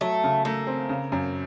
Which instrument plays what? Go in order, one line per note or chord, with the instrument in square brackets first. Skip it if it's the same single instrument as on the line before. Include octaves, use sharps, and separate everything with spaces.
[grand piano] F#3 [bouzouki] A3
[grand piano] C#3
[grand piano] A3 [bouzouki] A#3
[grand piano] C4
C#3
F#2